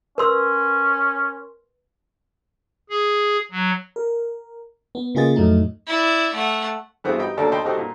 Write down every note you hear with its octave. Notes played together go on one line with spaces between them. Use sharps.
C#4 A#4 B4 C6 E6
G#4
F#3
A#4
B3
C#3 A#3 F4 G#4 D#5 A6
F2 A2 F#3 A3 D#4
E4 D5
A3 F#5
G2 E3 G#3 B3 C4 F#4
D#4 G4 G5 B5
D#2 B2 D3 A4 D5 A#5
D#5 G5 A5 B5 C6
G3 C4 D#4 F#4 G4 A4
A#2